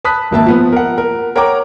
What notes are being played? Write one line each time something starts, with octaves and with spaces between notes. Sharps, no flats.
A5 B5 D#6 F#6 B6
G#1 A#3 E5 A5
F3 B3 B4
A#4 F#5
A#4
A#4 C#5 F#5 G5 A#5 D6